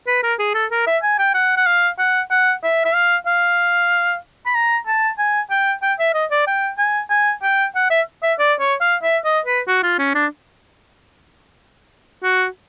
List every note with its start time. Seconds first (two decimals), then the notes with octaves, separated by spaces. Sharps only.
0.07 B4
0.23 A#4
0.39 G#4
0.54 A4
0.71 A#4
0.87 E5
1.03 G#5
1.19 G5
1.34 F#5
1.57 F#5
1.66 F5
1.99 F#5
2.31 F#5
2.63 E5
2.85 E5
2.94 F5
3.26 F5
4.46 B5
4.55 A#5
4.87 A5
5.19 G#5
5.50 G5
5.82 G5
5.99 E5
6.14 D#5
6.31 D5
6.47 G5
6.78 G#5
7.10 G#5
7.43 G5
7.75 F#5
7.90 E5
8.22 E5
8.39 D5
8.60 C#5
8.81 F5
9.03 E5
9.25 D#5
9.45 B4
9.67 F#4
9.83 F4
9.99 C#4
10.15 D4
12.23 F#4